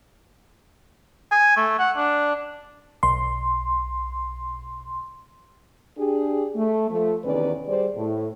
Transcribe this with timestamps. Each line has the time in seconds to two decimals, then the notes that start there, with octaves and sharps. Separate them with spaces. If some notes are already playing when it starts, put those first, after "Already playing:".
1.31 G#5
1.56 A3
1.79 F#5
1.97 D4
3.03 B1 C6
5.97 D4 G4 G#4
6.55 A3
6.89 F3 A3
7.24 E2 C3 D#3 C#4 B4 D5
7.66 G3 G#4 C5 D5
7.95 A2